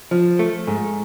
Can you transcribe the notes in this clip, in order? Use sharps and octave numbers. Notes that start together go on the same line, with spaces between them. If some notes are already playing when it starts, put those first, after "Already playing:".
F3
A3
G#2